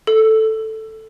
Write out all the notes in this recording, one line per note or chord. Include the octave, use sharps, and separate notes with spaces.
A4